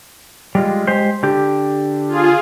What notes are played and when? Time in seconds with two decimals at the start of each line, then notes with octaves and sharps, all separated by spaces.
0.55 G3 G#3 F4
0.87 G#3 G4 C5
1.23 D3 G4
2.08 F4 G#4